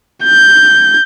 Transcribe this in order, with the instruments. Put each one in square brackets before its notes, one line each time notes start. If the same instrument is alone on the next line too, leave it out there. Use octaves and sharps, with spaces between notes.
[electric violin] G6